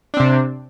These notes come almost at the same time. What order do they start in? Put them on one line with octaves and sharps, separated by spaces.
D4 C4 C3